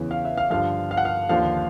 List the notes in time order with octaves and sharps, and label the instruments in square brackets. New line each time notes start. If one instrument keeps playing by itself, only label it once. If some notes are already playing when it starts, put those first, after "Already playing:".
Already playing: [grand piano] E2 C#3 E3
F5
E5
F5
G2 D3 F3 F5
F5
F#5
F5
D#2 D3 F3 F5